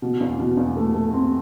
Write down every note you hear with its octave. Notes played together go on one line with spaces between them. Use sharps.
B2
E2
B2
E2
A3
A3
C4